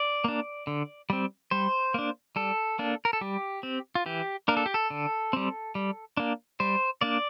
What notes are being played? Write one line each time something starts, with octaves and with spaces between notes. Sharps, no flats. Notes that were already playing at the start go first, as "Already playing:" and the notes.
Already playing: D5
A#3 D4
D3
G3 C4
G3 C5
A#3 D4
G3 A4
A#3 D4
A#4
A4
G3 G4
C4
F4
E3 G4
A#3 D4 A#4
A4
G4
A4
D3
G3 C4
G3
A#3 D4
G3 C5
A#3 D4 D5